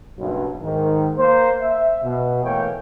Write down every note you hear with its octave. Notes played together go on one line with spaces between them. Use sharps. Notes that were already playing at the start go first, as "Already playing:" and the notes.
F#1 B1 G2
G#2 D#3
A#3 C5
E5
B2
E3 A3 A#3 C#5 G5